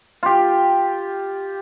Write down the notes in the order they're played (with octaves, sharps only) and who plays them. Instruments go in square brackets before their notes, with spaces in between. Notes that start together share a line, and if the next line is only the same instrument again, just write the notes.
[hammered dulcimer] F4 G4